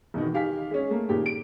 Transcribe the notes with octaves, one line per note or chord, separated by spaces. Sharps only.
E2 B2 D#3
D#3 G4 F5 G#5 B6
G#3 C#4
A3 A#3
A#2 D#3 G#3 G4
D7